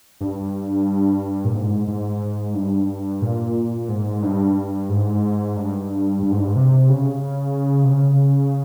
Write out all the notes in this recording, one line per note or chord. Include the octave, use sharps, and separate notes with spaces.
G2
A#2
G#2
G#2
G2
A#2
G#2
G2
G#2
G2
G2
G#2
G2
G#2
C3
C#3
C3
C#3